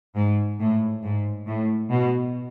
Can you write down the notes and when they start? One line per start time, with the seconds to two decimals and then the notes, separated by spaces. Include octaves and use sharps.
0.16 G#2
0.60 A2
1.03 G#2
1.47 A2
1.90 B2